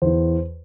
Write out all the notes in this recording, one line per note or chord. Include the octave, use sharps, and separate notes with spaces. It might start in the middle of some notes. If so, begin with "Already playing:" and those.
E2 E3 C5